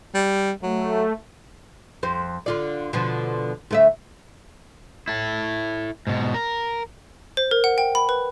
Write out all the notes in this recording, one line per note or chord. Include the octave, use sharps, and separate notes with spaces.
G3
F#3 A3
F2 C5
D3 F4 D5
B2 D3 F3
D2 A3 E5
E4 A4
G#2 B2
A#4
C5
A#4
F#5
G5
B5
B4